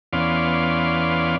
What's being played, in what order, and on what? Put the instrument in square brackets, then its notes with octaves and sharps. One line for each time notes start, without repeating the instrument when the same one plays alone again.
[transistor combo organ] E2 B3 C#4 D5 F5 C6